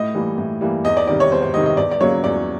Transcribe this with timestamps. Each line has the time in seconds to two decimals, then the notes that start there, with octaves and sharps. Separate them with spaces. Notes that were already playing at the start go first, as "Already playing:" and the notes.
Already playing: A2 D#5
0.15 E3 G3 A#3
0.38 A2
0.61 E3 G3 A#3
0.84 E2 D#5
0.97 D5
1.07 C3 D#3 G3 D5
1.20 C#5
1.32 E2 C5
1.42 C5
1.54 C3 D#3 G3 D#5
1.66 D#5
1.77 E2 D5
1.91 D5
2.01 C#3 F#3 A#3 C#5
2.24 E2 D5